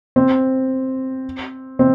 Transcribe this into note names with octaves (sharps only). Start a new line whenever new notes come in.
C4
C4